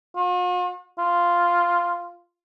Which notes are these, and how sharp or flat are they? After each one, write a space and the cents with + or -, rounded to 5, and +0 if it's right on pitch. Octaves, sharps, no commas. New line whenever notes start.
F4 +45
F4 -5